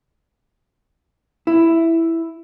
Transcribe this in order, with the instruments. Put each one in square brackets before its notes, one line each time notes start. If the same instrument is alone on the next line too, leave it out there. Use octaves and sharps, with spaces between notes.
[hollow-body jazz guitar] E4